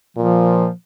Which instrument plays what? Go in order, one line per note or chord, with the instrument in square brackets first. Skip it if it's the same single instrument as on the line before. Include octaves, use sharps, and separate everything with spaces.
[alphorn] A#2 [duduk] F3